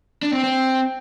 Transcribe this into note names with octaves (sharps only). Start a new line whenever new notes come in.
D4
C4
C4